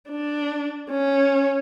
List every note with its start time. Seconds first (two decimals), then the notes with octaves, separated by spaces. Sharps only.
0.10 D4
0.91 C#4